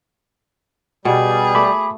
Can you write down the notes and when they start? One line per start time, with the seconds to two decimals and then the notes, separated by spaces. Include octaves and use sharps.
1.05 B2 G3 G#4
1.55 A3 B5 D6